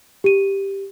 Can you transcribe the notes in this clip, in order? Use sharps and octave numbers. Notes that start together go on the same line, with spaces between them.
G4 D#7